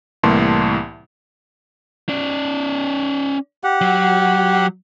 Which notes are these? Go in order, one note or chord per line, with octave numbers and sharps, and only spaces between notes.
C2 A2 E3 A#3 A5 C6
C#4 D5
G4 F#5
F#3